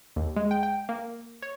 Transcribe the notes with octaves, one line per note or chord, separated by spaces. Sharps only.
D#2
G#3
G5
G5
A#3
C#5